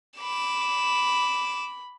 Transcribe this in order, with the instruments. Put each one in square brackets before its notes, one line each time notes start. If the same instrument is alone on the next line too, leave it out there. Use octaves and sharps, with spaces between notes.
[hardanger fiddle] B5 [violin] D6 E7